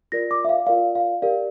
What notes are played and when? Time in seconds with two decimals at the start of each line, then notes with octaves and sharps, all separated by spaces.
0.12 F4 A#4 D5 A#6
0.31 D6
0.45 E5
0.49 F5
0.67 F4 A#4 D5 F5
0.95 F5
1.22 G4 A#4 D5 F5